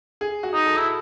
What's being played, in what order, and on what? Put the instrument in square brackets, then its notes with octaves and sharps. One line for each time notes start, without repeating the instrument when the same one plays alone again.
[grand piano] G#4
F#4
[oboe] D#4
[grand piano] A4
[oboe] E4